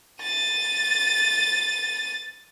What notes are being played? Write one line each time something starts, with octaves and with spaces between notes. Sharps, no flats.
A6 D#7